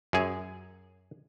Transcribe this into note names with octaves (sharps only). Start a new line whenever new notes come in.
F#2 G#4